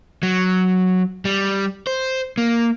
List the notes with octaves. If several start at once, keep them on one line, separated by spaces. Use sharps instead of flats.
F#3
G3
C5
A#3